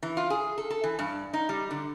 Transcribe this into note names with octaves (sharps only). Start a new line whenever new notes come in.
E3
F4
G#4
A4
A4
E3
G2
D#4
G3
D3